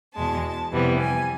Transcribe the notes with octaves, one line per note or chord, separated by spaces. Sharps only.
E2 B2 G#3 A5
F2 C3 E3 G3 B3
G#5